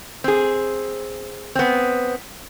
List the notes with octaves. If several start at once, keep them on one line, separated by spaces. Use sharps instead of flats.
C4 G#4
B3 C4